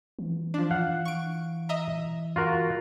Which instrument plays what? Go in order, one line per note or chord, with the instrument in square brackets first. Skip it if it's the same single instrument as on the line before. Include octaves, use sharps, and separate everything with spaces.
[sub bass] E3
[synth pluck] F3 D4
[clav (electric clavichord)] F5 F#5
[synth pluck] C#6 D7
D#5 E5 A#5
[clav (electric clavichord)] F4 F#4 A#4